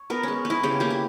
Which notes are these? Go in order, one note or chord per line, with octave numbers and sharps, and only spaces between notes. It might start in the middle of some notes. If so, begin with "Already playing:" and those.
Already playing: C#5
B3 A#4
G#3 C#4
B3
E4
C#3 G4
A#3 G4
E4